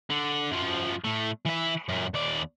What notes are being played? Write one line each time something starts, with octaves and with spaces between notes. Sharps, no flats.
D3
F#2 F3
A2 A3
E3 E5
F#2 A#2
D#2 D5